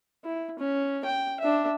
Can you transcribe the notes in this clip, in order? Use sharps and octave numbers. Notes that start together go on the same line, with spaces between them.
E4
C#4
G5
D4 E5